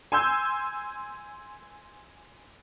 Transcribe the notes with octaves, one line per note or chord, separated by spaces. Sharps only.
G#5 C6 E6 G6